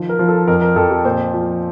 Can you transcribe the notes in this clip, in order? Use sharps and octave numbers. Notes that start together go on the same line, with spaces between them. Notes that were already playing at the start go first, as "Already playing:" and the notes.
Already playing: D#3 F3
A#4
F3
A4
F2 A#4
A#4
F2 A4
G4
A#2 C5
F3